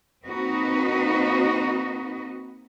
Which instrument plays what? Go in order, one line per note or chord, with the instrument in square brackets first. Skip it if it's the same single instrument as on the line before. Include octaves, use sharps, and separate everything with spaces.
[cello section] A#3 C4 D#4 F#4 B4 D#5